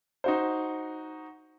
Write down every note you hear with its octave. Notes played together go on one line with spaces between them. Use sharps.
D#4 F#4 C5